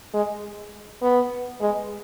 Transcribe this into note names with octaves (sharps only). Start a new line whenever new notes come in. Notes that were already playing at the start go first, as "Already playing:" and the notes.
G#3
B3
G#3